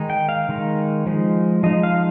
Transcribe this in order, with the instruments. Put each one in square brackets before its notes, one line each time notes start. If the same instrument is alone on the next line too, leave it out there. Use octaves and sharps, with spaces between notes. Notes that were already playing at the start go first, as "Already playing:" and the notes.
Already playing: [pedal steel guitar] D#3 G#3 D#4
G5
F5
D#3 G#3 D#4
F3 G#3 D#4
F3 G#3 D#4 D#5
F5